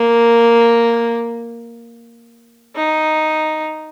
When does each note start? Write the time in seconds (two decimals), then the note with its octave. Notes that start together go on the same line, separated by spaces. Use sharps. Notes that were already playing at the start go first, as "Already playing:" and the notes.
Already playing: A#3
2.75 D#4